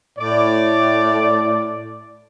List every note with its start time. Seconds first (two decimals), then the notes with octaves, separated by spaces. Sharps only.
0.19 A2 D5